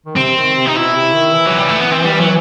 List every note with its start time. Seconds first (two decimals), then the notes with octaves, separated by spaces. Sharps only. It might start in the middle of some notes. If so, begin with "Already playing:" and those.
0.06 D#3
0.17 C3 C4
0.36 D#3
0.55 C3
0.67 D#4
0.75 B2 E4
0.94 C3
1.13 D#3
1.33 E3
1.46 F#3
1.58 G3
1.68 A3
1.80 B3
1.91 C4
2.05 G3
2.20 F#3